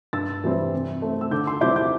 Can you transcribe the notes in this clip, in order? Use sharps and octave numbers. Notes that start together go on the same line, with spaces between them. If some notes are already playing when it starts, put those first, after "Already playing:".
G2 E6 A6
E3 G3 C4
C3
A3 C4
E6
D3 D6 G6
C6 E6
G3 C4 E4 D6 G6
D6 G6